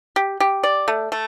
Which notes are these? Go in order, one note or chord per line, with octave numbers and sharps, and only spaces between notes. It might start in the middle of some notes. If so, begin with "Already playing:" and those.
G4
G4
D5
A3
A3